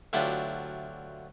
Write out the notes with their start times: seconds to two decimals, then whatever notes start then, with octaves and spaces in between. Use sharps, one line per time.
0.13 D2 F#3 D4 E4 F4 G4